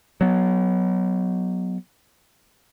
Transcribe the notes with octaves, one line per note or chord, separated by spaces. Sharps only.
F#3 B3